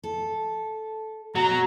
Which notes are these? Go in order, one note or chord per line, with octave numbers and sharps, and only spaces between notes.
A4
B2 F#3 A#5